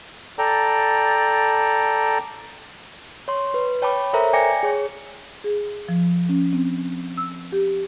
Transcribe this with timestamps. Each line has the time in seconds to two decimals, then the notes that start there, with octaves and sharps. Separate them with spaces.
0.39 A4 D5 G5 A#5
3.28 C#5 C6
3.54 B4
3.82 C#5 G5 A5 B5 D6
4.13 A4 A#4 C5 C#5 E5 A#5
4.33 D5 G5 G#5 D6 A#6 C#7
4.63 G#4 C#5
5.44 G#4
5.89 F3
6.29 C#4
6.53 C4
7.17 E6
7.52 G4